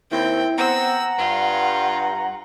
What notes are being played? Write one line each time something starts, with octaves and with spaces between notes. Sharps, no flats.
D#2 C4 E4 G5
B3 C4 F#5 A#5 E6
G2 F4